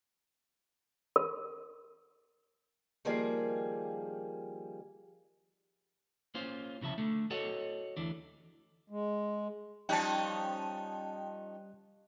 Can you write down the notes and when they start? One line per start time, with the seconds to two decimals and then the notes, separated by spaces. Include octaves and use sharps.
1.16 A#4
3.05 D#3 F3 G3 A#3 G#4
6.35 A#3 C#4 F4 C5
6.81 C2 C#3 F3 E5 A5
6.98 D3 A3
7.30 F#4 A4 C#5 D#5 F#5
7.97 D2 E3 D4
8.90 G#3
9.89 F3 G3 C#4 D#4 D#5 G5 A5 F#6